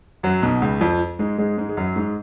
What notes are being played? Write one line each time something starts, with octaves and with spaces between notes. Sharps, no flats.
F#2 F#3
B1 B2
C#2 C#3
F2 F3
G#2 G#3
G#2 G#3
G#2 G#3
G#3
F#2 F#3
G#2 G#3